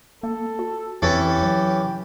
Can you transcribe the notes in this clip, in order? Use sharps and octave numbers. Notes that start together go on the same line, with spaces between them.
A#3 A4
F#4
F2 E3 C#4 G4 A4
F#3